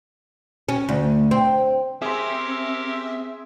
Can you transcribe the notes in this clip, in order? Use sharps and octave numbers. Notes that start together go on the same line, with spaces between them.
C#4
D2
C4
C4 G4 G#4 A#4 E5 C6